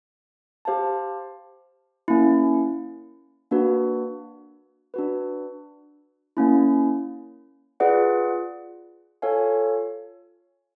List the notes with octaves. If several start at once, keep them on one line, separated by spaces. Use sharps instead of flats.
G4 C5 F5 A5
A#3 C#4 E4
A#3 D4 F#4 B4
D4 F#4 B4
A#3 C#4 E4
F4 G#4 B4 D5 F#5
F4 A4 C#5 F5 G#5